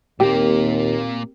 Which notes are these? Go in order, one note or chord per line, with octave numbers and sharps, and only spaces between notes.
D#2 A#2 A#3 C4 G4 A#4